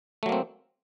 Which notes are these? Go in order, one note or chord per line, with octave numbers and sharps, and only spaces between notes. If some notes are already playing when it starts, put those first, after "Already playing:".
F#3 A3 A#3 C4